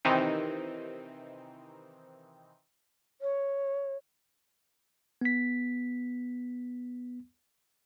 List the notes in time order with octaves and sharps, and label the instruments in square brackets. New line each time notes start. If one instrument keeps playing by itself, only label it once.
[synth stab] C3 D#3 E3 C4 D#4
[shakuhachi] C#5
[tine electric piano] B3 B6